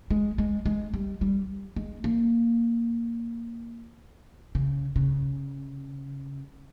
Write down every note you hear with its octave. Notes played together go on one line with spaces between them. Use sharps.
G#3
G#3
G#3
G3
G3
G#3
A#3
C#3
C#3